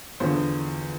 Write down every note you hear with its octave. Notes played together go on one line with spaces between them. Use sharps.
E2 D3 F3 C5